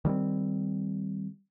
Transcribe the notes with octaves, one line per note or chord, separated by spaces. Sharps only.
D#3 G3 B3 C4